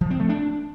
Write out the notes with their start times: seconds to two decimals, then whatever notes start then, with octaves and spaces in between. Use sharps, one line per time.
0.01 F3
0.10 C4
0.20 A3
0.29 D4